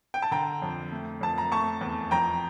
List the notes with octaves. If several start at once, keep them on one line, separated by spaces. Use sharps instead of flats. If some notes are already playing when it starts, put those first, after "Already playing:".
G5
A5
D3 G5 A#5
F2
A3
F2 A5
A#5
A3 A5 C#6
E2
F2 G5 A#5